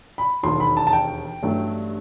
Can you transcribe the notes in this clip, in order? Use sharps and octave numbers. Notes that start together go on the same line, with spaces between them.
B5
E1 D#2 D#3 F#3 C6
B5
A5
A5
G5
A1 G2 F#3 A3